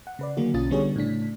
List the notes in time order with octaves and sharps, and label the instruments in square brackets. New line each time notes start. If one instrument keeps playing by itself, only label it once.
[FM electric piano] F#5
C#3 B4 D5
D3 D#3 F#3 A#3 F#4 G#4
B1 C#4 F4 D#6 A6
D3 G3 B3 F#4 G#4 C#5
A2 C#3 D4 B6